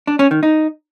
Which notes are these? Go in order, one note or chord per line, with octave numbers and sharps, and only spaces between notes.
D4
C#4
D#3
D#4